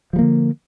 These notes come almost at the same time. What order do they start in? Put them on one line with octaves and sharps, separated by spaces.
F3 G3 A#3 D3